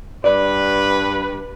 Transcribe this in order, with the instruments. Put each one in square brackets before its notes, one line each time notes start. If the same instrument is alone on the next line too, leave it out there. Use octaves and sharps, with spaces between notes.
[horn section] G2 B4 [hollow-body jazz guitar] D5